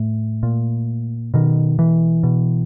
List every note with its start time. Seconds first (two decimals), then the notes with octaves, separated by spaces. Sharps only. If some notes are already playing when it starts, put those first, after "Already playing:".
Already playing: A2 A3
0.43 A#2
1.34 B2 D#3
1.79 E3
2.23 B2